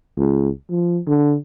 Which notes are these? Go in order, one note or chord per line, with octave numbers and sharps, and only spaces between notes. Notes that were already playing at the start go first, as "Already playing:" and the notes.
C#2
F3
D3